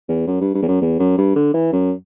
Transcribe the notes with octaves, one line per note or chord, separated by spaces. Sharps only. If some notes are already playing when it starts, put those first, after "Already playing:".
E2
F#2
G2
G2
E2
F#2
E2
F#2
G2
D3
E3
F#2